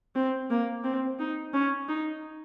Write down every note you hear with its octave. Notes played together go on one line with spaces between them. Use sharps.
C4
A#3
C4
D#4
C#4
D#4